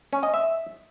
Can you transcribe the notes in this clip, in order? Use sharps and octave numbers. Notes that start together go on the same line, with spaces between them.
C#4
D#5
E5